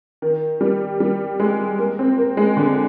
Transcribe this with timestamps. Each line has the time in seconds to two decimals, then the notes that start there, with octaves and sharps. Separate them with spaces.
0.22 D#3
0.61 G3
1.00 G3
1.40 G#3
1.79 A#3
1.99 C4
2.18 A#3
2.37 G#3
2.57 D3